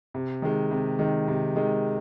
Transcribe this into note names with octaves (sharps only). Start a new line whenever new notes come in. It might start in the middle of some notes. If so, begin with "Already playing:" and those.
C3
D#3 G#3
C3
D#3 G#3
C3
D#3 G#3